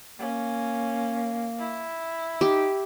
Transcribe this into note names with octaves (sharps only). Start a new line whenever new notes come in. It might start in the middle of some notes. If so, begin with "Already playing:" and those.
A#3 C#4
E4
D#4 G4